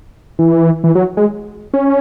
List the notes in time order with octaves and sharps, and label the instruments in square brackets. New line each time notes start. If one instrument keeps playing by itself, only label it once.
[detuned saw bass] E3
E3
F#3
G#3
C#4